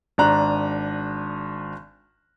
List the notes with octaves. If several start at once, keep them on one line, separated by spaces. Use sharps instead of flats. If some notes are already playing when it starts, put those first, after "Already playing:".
G#1 D4 A#5 F#6